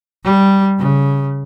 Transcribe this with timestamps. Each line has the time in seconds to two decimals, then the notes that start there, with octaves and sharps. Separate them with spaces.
0.24 G3
0.78 C#3